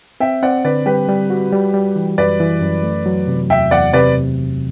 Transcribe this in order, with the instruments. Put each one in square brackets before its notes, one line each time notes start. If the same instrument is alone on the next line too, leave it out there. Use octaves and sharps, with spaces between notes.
[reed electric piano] C4 [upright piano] E5 G5
[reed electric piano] C4 [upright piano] D5 F#5
[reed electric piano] D3 [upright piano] B4 D5
[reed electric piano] G3 [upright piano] G4 B4
[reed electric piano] G3
F#4
G3
G3
E3
[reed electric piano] F#2 [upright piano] B4 D5
[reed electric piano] E3
F#2
A3
F#3
C3
[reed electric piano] E2 [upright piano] E5 G5
[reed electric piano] E2 [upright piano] D5 F#5
[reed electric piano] C3 [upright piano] B4 D5